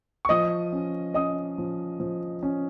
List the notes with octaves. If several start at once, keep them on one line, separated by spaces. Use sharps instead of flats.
C#6
F3 D#5 D#6
C#4
C#4 D#5 D#6
F3
F3
C#4